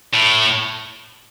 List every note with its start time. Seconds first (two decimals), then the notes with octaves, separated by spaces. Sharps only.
0.14 A2